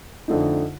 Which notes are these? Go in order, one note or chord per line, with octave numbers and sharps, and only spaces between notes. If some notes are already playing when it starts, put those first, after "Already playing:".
F2 D3 A3 D#4